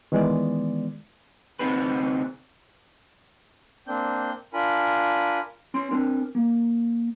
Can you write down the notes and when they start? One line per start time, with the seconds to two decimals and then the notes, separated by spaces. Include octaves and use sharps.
0.12 D#3 E3 G#3 B3 D5
1.59 D2 C3 C4 D#4 G#4 B4
3.87 A#3 C4 D4 G6
4.53 D4 F4 A#4 G#5 B5
5.74 C#4 C6
5.91 C4 D4 A#4
6.35 A#3